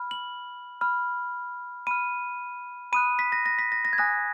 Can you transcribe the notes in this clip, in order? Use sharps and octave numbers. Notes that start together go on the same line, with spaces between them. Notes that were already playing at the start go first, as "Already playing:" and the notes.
Already playing: B5 F6
F#7
B5 F6
B5 F6 D#7
B5 D#6 F#6 D#7
B6
A#6
A#6
B6
A#6
A#6
G#6
G#5 D#6 F#6 A#6